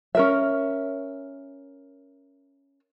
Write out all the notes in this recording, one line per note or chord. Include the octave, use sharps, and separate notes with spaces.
C#4 A#4 E5